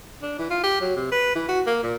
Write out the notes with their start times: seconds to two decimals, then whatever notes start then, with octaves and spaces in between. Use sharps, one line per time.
0.22 D4
0.39 E3
0.50 F4
0.63 G4
0.81 F#3
0.96 C3
1.12 B4
1.35 E3
1.49 F#4
1.66 A#3
1.83 A#2